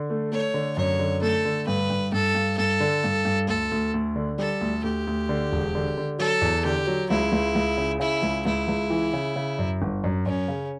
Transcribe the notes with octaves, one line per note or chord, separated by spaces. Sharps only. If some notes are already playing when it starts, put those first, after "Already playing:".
Already playing: D3
A3
A3 C#5
D3
F#2 C#5
D3
A3 A4
D3
G2 B4
G2
G2 A4
G2
G2 A4
D3
G2
G2
D2 A4
D2
D2
D3
G3 A4
D2
D2 G4
D2
D3
E1
D3
D3
F#3 A4
E2
D3 G4
F#3
C#2 E4
C#2
C#2
C#3
C#3 E4
C#2
C#2 E4
C#2
E3
C#3
C#3
F#2
G1
F#2
F#2 C#4
C#3